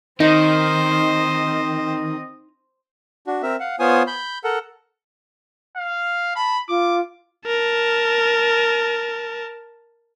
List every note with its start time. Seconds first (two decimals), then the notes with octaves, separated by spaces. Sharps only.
0.20 D#3 C4 D#4 C5 D#5
3.27 D4 F#4
3.43 C4 A#4 E5
3.60 F5 F#5
3.79 B3 F4 C5 C#5 G#5 D#6
4.07 B5 G6
4.44 A4 A#4 F#5
5.77 F5
6.36 A5 B5
6.69 F4 D6
7.47 A#4 A5